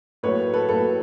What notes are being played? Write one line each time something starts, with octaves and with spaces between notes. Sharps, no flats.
A2 F#3 A#3 B4 C#5
A4 B4
A2 F#3 A#3 A4 B4